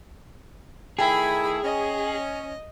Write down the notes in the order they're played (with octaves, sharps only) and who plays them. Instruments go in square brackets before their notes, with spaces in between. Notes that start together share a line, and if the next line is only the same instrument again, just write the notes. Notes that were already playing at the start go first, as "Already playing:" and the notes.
[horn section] D#3 A3 E4 [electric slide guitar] G#4 [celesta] G5 [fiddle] B5
[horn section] C#4 [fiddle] D#5